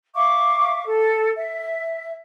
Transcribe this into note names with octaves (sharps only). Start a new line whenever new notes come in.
E5 F5 C#6 D6
A4
E5